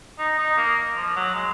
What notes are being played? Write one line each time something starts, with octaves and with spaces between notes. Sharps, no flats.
D#4
D#4
A#3
F3
F#3
G#3